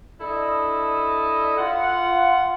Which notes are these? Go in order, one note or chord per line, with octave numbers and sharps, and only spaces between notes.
D4 E4 A4 D#5
F4 F#5